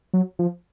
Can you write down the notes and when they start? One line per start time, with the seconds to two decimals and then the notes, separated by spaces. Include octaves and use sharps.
0.14 F#3
0.39 F3